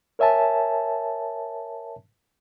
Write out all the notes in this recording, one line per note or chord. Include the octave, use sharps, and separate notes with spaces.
A#4 C#5 E5 G#5 A5